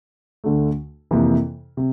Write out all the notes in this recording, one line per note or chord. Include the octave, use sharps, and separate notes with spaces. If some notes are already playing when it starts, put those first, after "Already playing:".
D2 D3 A3
F2 C3 E3 A#3
C3